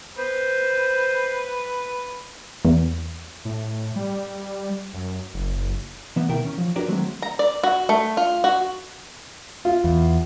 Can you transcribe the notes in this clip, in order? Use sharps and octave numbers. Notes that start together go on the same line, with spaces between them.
B4 C5
E2
A2
G3
F#2
F#1
E3 A#3 B3
D2 B2 D#3 E4 A#4 G5
C#4
F3
D4 F#4 G4 A#4 B4 D5
D#3 F#3 G#3 A3 C4
A#5
D5
F#4
A3
F4
F#4
F4
E2